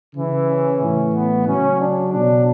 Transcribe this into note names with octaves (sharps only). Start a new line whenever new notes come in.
C#3 E3
C#4
A2 E3
B3
C#3 F#3 C#4
D4
B2 F#3 D4